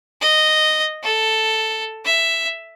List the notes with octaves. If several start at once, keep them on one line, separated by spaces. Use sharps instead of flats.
D#5
A4
E5